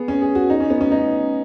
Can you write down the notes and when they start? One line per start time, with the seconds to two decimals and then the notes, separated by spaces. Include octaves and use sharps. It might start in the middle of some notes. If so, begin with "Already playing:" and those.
Already playing: B3 G#4
0.08 C#4
0.22 G#4
0.35 F#4
0.50 D#4
0.60 C#4
0.70 B3
0.81 C#4
0.91 D#4